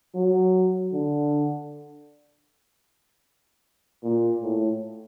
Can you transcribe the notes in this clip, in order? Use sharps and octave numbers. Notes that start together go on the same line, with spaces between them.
F#3
D3
A#2
A2